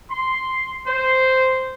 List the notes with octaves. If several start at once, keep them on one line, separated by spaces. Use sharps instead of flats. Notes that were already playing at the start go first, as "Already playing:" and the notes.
C6
C5